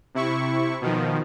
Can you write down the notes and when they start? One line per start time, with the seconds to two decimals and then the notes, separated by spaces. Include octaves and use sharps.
0.15 C3 E4 C#6
0.81 B2 D#3 F3